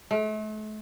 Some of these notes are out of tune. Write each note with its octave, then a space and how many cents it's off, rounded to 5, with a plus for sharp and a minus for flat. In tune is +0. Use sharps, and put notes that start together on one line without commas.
A3 -40